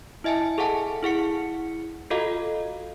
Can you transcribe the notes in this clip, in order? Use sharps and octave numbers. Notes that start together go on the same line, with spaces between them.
E4 D#5 E5 G#5 A5
G#4 A4 F5 F#5 G#5 A5
E4 G#4 F#5 C#7
F4 F#4 A4 D#5 F5 A#5